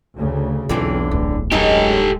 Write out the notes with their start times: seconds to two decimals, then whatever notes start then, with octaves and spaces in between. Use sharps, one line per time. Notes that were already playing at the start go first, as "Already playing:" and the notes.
0.16 D2 C#3
0.69 B1 E2 D3 E3 C4 F4
1.11 D1
1.52 F#2 G#3 D#4 G4 A4